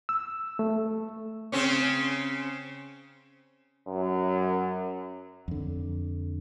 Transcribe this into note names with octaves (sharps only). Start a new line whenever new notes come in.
E6
A3
C#3 C4 C#4
F#2
F2 D3